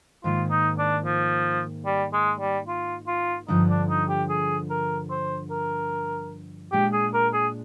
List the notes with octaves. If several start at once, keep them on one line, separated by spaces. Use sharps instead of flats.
G#2 D#3 A#3 F4
D#4
D4
F3
G3
G#3
G3
F4
F4
G2 D3 F3 D#4
D4
D#4
G4
G#4
A#4
C5
A#4
A#2 G#3 D4 G4
G#4
A#4
G#4